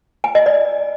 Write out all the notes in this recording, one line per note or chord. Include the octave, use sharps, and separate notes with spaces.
G#5
D#5
D5